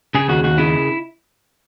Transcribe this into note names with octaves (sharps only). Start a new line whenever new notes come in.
C#3 G#4
D#2 F#4
D#2 F#4
C#3 E4